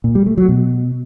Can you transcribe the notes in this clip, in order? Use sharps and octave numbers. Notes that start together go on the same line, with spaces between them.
A#2
G3
A3
F#3
B2